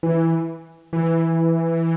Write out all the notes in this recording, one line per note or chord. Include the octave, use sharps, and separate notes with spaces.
E3
E3